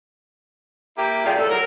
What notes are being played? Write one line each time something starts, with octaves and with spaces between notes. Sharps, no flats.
A#3 E4 G4
C3 G3 A3 F4 G#4
A2 A4
A2 F#3 A#4